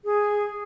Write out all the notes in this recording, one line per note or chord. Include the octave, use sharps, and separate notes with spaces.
G#4